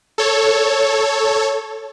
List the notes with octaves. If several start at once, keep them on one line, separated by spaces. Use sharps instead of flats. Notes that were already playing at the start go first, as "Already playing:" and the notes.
A4 C#5